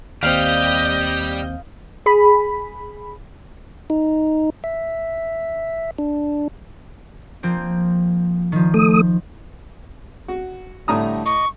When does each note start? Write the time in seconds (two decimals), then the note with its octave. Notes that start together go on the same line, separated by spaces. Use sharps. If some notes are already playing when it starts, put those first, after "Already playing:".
0.23 D#2 G3 C4 D#5 F5 G6
2.06 G#4 B5
3.90 D#4
4.64 E5
5.98 D4
7.43 F3 A#3 C4
8.52 D#3 F3
8.74 A3 D#6
10.28 F#4
10.88 A2 D3 G3 A3 A#5 D#6
11.26 D#5 C#6